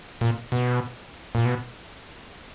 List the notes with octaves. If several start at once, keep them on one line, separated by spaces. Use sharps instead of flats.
A#2
B2
A#2
B2